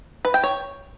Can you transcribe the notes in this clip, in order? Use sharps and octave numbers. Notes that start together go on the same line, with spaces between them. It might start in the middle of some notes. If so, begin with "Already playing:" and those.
B4
G5
C#5